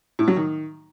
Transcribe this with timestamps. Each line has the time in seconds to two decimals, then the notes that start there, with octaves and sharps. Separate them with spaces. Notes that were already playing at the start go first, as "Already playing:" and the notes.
0.19 A2
0.28 F#3
0.36 D#3